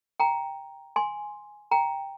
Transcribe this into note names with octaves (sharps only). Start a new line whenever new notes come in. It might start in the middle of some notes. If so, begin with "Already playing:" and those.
G5 A#5
G#5 C6
G5 A#5